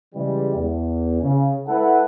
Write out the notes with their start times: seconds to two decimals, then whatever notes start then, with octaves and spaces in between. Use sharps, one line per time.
0.15 C#3 E3 G3 G#3
0.56 E2
1.21 C#3
1.68 G#3 E4 A4 B4 F#5